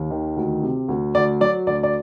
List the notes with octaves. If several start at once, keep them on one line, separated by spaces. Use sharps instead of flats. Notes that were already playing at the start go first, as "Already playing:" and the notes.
Already playing: D#2
D#3
D2
C3
D2
D2 D5
F#3 D5
D2 D5
D5